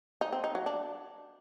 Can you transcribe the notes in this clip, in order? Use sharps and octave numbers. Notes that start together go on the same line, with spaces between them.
D#4
C4
D#4
F#3
D4